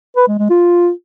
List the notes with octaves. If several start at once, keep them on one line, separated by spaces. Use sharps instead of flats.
B4
G#3
G#3
F4